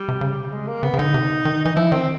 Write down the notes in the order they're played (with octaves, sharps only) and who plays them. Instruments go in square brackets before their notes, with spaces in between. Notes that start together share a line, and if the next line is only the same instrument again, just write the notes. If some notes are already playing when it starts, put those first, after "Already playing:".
Already playing: [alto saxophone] G3
[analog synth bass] C3
C#3
[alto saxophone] G3
G#3
A#3
[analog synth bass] C#3 [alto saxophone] B3
[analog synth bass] C#3
[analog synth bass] D3 [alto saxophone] D#4
[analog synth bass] C3
D#3
[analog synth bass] E3 [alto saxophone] D#4
[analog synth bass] F3 [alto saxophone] E4
[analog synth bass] D#3 [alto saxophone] C4